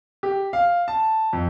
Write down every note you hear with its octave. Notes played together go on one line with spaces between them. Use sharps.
G4
F5
A5
F2